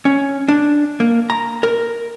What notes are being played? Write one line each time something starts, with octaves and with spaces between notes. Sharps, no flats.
C#4
D4
A#3
A#5
A#4